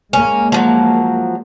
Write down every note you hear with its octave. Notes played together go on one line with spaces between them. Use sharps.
G#3 A#3 C#4
F3 F#3